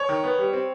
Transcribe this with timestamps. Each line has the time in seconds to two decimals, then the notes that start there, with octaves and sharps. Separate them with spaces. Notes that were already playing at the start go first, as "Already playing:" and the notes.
Already playing: C#5
0.09 D#3
0.24 B3
0.39 G3
0.53 C4